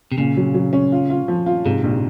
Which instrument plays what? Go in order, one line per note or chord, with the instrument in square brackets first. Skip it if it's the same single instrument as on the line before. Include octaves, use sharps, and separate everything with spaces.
[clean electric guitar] C3
[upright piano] A#2 [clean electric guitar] C#3
[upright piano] F#3
F#3
C#4
F4
F4
F3
F4
[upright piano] G#2 [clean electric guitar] C3
[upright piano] A#1